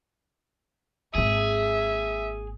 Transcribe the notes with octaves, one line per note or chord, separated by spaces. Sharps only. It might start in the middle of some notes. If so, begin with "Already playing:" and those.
G#1 A#3 G#4 E5